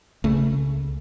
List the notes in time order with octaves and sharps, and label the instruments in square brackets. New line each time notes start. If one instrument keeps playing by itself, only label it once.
[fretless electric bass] C#2 C#3 A3